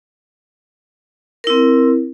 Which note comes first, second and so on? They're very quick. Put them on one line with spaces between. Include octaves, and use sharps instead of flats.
A#4 E4 C4